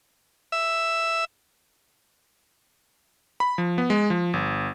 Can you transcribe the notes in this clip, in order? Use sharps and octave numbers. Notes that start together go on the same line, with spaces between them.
E5
B5
F3
B3
G#3
F3
G1